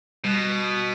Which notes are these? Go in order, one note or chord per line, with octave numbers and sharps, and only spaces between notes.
B2 G3